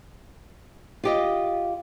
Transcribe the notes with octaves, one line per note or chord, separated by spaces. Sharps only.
F4 G4 D#5